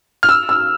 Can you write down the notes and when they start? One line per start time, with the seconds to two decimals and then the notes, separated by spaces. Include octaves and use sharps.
0.23 F6
0.29 E6
0.49 E6